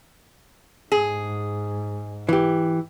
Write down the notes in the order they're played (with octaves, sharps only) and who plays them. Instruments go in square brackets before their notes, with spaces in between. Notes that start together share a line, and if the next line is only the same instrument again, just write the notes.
[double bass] G#2 [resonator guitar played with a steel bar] G#4
[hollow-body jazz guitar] E3 G4